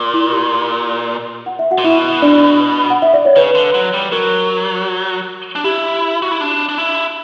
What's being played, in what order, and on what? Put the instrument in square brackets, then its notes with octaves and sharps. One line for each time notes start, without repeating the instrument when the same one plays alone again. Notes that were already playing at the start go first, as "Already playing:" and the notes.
Already playing: [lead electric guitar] A#2
[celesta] E4
G4
F#5
E5
F#4 F#5
[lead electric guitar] A#2
[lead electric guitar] B2 [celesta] E4 E5
[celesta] D4 D5
F#5
E5
D5
C#5
[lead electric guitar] C#3 [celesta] B4
[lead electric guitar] D3
F#3
G3
[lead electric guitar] F#3 [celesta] A#4
[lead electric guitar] D4
[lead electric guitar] E4 [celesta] G4
[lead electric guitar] F#4
E4
D4
D4
E4